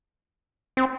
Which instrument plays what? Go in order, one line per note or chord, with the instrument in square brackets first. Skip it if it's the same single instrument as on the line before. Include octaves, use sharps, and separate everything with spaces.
[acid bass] C4